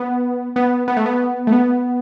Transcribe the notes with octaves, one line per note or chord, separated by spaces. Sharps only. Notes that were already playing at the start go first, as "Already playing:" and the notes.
Already playing: B3
B3
B3
A3
B3
A3
B3